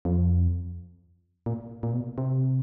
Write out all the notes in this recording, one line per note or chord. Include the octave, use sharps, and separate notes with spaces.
F2
A#2
A#2
B2
C3